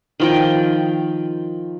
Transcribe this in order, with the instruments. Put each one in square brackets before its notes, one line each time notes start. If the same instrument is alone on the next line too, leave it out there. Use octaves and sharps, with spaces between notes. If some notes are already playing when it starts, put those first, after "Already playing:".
[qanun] D#3 F3 G5